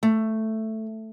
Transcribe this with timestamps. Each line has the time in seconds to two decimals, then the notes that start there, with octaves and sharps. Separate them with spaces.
0.03 A3